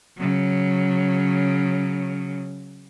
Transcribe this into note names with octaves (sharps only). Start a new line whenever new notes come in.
C#3 F#3